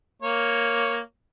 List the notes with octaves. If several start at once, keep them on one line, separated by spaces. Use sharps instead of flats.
A#3 C#5